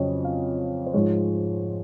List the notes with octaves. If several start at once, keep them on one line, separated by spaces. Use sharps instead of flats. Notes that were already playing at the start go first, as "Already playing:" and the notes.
Already playing: F2 C#3 F#3 C#5 D#5
F5
C5
G#2 F3 G#3 C#5